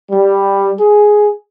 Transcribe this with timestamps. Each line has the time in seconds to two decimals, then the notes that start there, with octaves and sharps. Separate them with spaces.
0.11 G3
0.79 G#4